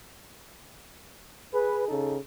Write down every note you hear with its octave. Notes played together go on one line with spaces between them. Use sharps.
G#4 B4
C#3 D#4 A4